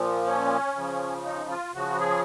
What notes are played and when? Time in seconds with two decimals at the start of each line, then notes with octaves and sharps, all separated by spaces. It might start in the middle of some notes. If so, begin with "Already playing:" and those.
Already playing: A#2 F3
0.27 C#4
0.76 C#3 F3
1.25 D#4
1.50 F4
1.74 C#3 F3 F#4
1.99 G#4